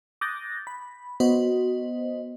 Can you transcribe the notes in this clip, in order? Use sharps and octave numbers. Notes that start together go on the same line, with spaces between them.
D6 D#6 F#6 G6 A6 A#6
B5
B3 F#4 C5 D#5